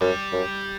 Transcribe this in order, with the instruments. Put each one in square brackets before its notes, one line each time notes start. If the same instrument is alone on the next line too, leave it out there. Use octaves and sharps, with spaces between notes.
[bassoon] F#2 [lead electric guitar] G3
[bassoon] F#2